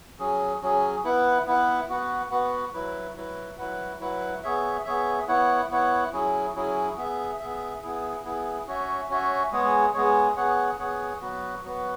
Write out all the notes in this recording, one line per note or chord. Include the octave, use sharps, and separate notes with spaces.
F#3 C#4 G#4
F#3 C#4 G#4
B3 E4 B4 F#5
B3 E4 B4 F#5
B3 F#4 B4 F#5
B3 F#4 B4 F#5
F#3 E4 B4
F#3 E4 B4
F#3 E4 B4 F#5
F#3 E4 B4 F#5
B3 G#4 C#5 E5
B3 G#4 C#5 E5
B3 E4 C#5 F#5
B3 E4 C#5 F#5
F#3 C#4 E4 G#4
F#3 C#4 E4 G#4
B3 G#4 E5
B3 G#4 E5
B3 E4 G#4
B3 E4 G#4
C#4 F#4 C#5 E5
C#4 F#4 C#5 E5
G#3 B3 G#4 C#5
G#3 B3 G#4 C#5
B3 G#4 C#5 F#5
B3 G#4 C#5 F#5
F#3 B3 F#4 B4
F#3 B3 F#4 B4